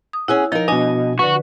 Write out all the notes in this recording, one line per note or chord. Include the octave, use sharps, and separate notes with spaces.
D#6
C#4 E4 G#4 F#5
F3 D#4 A#4
B2 D4 D#5 G#5
D3 F#4 B4 C#6